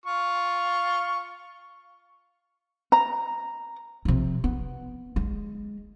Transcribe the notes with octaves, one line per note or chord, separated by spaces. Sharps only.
F4 C#6
A#5
C3 F3
B3
G#3